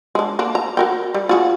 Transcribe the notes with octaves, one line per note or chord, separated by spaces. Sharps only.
G#3 D4
A#3 D4
A#5
F#4 A#4 G5
G3
F4 F#4 G#4